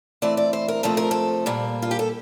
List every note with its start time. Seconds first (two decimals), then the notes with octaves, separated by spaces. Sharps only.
0.22 E3 A3 C4 D5
0.37 D5
0.53 C5
0.68 A#4
0.83 C3 F3 A3 C4 A4
0.97 A#4
1.11 A4
1.46 A#2 G3 A#3
1.82 F4
1.91 G4
1.99 A4